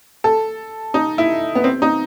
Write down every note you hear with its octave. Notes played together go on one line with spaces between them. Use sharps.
A4
D#4
E4
B3
C4
D#4